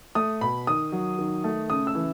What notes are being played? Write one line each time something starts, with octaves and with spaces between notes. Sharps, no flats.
A3 D#6
B2 B5
D#3 D#6
F#3
D#3
A3
C#3 D#6
E6
E3